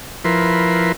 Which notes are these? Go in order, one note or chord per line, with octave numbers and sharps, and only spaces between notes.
F3 E4 A#4 B4 C6